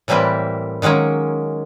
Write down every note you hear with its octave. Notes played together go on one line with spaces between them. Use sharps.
A2 E3 G3 A#3 C4 B4
D#3 F#3 G#3 A#3 C#4